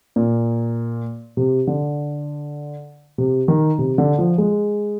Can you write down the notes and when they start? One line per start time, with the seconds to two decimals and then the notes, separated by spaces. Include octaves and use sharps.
0.16 A#2
1.37 C3
1.67 D3
3.18 C3
3.48 D#3
3.78 C3
3.98 D3
4.19 F3
4.38 G#3